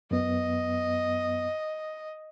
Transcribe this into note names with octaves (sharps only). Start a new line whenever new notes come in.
F#2 B3 D#5